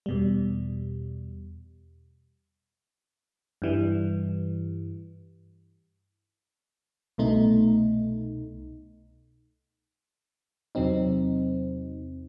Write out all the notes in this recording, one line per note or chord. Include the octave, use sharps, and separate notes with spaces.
E2 B2 G3
G2 E3 G3
C2 B2 A3 D#4
E2 C3 F#3 C4 D#4